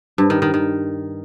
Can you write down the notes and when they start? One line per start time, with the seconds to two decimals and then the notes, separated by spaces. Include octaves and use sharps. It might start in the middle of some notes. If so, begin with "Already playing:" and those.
0.18 G2
0.30 D#3
0.42 D#3
0.54 D#3